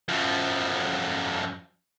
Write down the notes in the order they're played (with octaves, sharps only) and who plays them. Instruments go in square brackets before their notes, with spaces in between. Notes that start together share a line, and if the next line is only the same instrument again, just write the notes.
[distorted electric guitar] F#2 F3